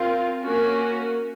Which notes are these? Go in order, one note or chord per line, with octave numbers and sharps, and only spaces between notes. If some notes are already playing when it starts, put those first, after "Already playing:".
Already playing: C4 F4 A#4
A#3 C#4 F#4 A#4